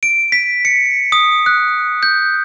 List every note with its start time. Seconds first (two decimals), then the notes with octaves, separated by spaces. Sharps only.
0.03 D7
0.32 B6
0.65 C#7
1.12 D#6
1.46 F#6
2.03 G6